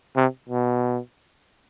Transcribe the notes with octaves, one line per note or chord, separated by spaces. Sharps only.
C3
B2